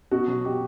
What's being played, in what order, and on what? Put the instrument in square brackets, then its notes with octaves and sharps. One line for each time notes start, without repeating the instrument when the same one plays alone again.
[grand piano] B2 F#4
F#3
B2 G4